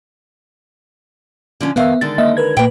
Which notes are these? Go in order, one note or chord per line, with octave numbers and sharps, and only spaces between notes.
D3 F3 C#4
F2 D#3 B3 E5 F5
D3 D#3 G#3 A6
A#3 D#5 E5
A#4 B4 G#6
A#2 A#3 B4 G5